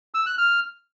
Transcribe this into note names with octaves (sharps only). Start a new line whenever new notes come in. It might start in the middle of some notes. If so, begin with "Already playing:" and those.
E6
F#6
F6